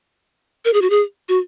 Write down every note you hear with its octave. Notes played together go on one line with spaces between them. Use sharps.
A#4
G#4
F#4
G#4
F#4